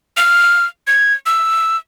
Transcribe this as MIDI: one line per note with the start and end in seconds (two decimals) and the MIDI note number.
0.17 0.65 89
0.87 1.14 92
1.26 1.77 88